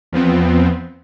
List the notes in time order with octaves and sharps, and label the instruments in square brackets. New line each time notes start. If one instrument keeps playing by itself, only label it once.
[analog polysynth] E2 F3 B3 C4